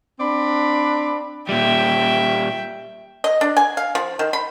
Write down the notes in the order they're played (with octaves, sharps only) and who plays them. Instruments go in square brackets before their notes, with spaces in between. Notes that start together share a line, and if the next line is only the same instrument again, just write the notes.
[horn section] C4 D4 D5 B5
[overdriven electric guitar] A#2 G3 [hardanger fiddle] E5 G5
[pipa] D#5
D4
G#5
F5
F3
D#3
B5